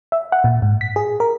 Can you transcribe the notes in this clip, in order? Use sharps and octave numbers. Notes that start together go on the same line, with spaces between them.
E5
F#5
A#2
G#2
B6
G#4
A#4